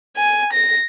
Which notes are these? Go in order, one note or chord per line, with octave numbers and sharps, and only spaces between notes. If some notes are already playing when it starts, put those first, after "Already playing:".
G#5
A#6